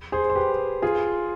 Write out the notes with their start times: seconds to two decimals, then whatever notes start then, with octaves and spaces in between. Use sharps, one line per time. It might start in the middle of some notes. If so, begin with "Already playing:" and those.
0.12 G#4 C5
0.30 C5
0.36 G4 B4
0.82 F4 G#4